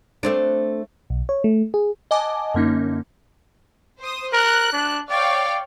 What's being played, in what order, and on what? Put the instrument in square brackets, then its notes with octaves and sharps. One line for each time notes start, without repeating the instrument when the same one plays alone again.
[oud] A3 C4 D4
[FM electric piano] B1
C#5
A3
G#4
[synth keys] D#5 F#5 G#5 A5 D6
F#2 D3 A#3 C#4 D#4
[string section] C5 D#6
[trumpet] A#4 [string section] F#6
[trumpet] D4
[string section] C#5 F5 G5 [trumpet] D5